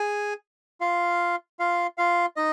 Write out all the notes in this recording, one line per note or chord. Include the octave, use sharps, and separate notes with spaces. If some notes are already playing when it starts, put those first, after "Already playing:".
Already playing: G#4 G#5
F4 F5
F4 F5
F4 F5
D#4 D#5